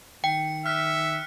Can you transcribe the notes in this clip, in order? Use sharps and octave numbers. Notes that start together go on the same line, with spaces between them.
D#3 G5 C#7
E5 F6 F#6 B6